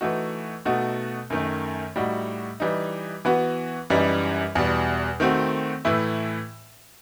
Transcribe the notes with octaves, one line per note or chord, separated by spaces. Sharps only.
E3 A3 D#4 F#4
B2 A3 D#4 F#4
F#2 D#3 A3
A2 G3 D#4 F#4
E3 G3 D#4
E3 B3 F#4
F#2 E3 G3 D#4
E2 B2 G3
D#3 A3 C4 F#4
A2 E3 A3 E4